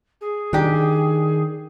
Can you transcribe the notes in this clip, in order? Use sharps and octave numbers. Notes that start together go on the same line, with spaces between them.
G#4
D#3 D4 G4